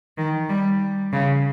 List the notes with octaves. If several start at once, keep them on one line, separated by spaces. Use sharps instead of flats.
D#3
G3
C#3